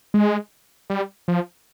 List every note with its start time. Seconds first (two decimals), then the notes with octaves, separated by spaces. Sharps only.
0.14 G#3
0.90 G3
1.28 F3